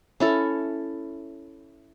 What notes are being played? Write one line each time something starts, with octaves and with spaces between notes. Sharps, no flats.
C#4 E4 A4